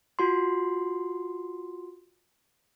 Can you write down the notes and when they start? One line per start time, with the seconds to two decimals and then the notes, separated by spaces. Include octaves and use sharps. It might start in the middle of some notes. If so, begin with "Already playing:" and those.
0.19 F4 F#4 C6